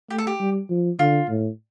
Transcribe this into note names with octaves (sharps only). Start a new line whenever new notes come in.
A3 G4
A4
G4
G3
F3
D3 F4
A2